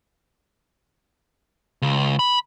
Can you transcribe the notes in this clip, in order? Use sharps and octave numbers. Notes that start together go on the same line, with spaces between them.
C#2
B5